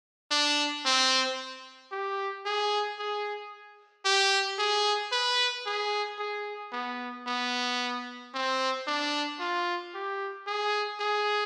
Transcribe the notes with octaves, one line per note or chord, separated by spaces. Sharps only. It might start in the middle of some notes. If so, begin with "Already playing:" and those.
D4
C4
G4
G#4
G#4
G4
G#4
B4
G#4
G#4
B3
B3
C4
D4
F4
G4
G#4
G#4